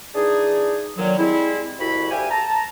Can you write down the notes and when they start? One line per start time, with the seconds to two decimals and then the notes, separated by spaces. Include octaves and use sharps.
0.15 E3 D4 D#4 G#4
0.97 A#2 D3 D#3 F#3
1.18 G3 G#3 C4 E4
1.79 C2 F2 E4 F#4 B5
2.11 D2 G4 E5 F5 G#5
2.31 A5 A#5